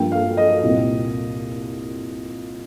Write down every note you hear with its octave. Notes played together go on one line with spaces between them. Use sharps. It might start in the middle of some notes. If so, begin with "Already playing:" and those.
Already playing: G2 F3 A#3 G5
F5
D#5
C2 A#2 A#3